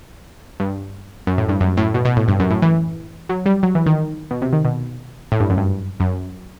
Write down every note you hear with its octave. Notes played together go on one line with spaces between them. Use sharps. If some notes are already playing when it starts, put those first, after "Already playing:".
G2
F#2
A2
G2
F#2
A2
B2
B2
A2
G2
F#2
A2
E3
F#3
G3
F#3
E3
D#3
B2
C3
D#3
B2
A2
G2
F#2
G2
F#2